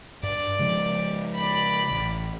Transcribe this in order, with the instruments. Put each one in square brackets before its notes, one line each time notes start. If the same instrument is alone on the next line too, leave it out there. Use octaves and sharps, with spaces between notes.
[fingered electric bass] G2 [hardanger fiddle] D5
[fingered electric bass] C#3 F3 G#3
[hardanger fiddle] D5 B5
[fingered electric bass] A1